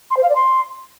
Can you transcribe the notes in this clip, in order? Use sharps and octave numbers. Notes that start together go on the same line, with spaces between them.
C6
C5
F5
D5
C6